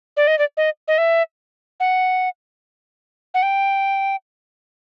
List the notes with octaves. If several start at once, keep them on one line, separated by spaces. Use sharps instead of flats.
D5
D#5
D5
D#5
D#5
E5
F#5
F#5
G5